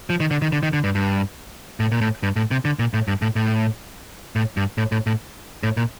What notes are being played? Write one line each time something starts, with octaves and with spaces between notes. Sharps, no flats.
F3
D#3
D3
D#3
D3
D#3
D3
G2
G2
A2
A#2
A2
G2
A2
C3
D3
A#2
A2
G2
A2
A2
A2
G2
A2
A2
A2
A2
A#2